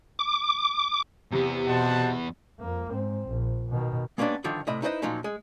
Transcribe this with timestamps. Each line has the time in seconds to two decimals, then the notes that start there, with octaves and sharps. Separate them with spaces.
0.19 D6
1.32 E2 C3 B3
1.68 B2 C5 F#5 A5
2.59 F2 A#3
2.90 G#2 C4
3.28 A#1
3.69 B2 D#3
4.18 G#3 A#3 B3 C#4 D4 G4
4.44 G2 D3 D#3 F3
4.67 A2 C3 D#5 E5 B5
4.82 D#4 E4 B4 C5 D5 D#5
5.02 A#2 F3 F#3 C#4 D#4
5.24 G#3